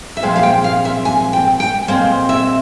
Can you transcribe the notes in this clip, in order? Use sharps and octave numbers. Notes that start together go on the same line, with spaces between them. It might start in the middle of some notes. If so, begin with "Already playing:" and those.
E5
A#2 F3 G#3 C4 F5
F5
G5
F5
E5
G#5
G5
G5
A#2 G#3 C4 F5
E5